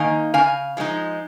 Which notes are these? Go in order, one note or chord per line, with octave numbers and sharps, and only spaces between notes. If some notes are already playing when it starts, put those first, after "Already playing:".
Already playing: D#3 A#3 D#4 F5 G#5
C#3 F5 G#5
F3 G#3 C4 D#4